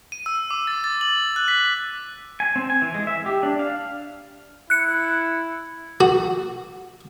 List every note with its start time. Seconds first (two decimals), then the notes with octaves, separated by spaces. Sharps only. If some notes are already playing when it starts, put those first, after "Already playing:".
0.12 D#7
0.26 E6
0.51 D6
0.67 A6
0.84 A6
1.01 F#7
1.36 F#6
1.48 B6
2.40 G#5
2.56 C4
2.70 G#5
2.82 E3
2.94 G#3
3.07 E5
3.26 G4
3.43 D4
3.59 F5
4.70 E4 F#6 C#7
6.01 F#4